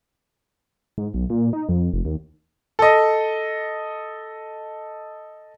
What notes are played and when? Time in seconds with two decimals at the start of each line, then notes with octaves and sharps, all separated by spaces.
0.98 G#2
1.14 B1
1.30 A#2
1.53 D#4
1.69 F2
1.93 F1
2.05 D#2
2.79 A4 D#5